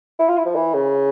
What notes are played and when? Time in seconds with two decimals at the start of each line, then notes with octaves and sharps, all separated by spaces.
0.19 E4
0.29 F4
0.38 E4
0.46 F3
0.55 E3
0.74 C#3